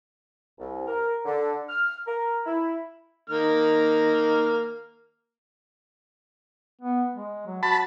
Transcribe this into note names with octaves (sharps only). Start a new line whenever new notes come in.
C2
A#4
D3
F6
A#4
E4
D#3 A#3 F6
B3
G#3
F#3
F#4 A5 B5